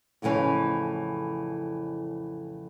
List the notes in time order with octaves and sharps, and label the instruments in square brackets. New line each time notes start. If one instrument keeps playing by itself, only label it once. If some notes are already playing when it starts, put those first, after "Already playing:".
[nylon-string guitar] F2 A2 C#3 E3 C#4